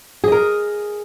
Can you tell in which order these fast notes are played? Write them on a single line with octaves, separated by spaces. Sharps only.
G#4 D#5 A#4